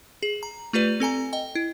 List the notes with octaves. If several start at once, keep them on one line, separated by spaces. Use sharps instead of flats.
G#4
A#5
A3 F4 G4 B4 D5
C4 A4 G#5 A#5
D#5 G5
E4